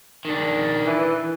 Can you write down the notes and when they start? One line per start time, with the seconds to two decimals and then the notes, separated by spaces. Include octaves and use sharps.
0.25 D#3 D4
0.86 E3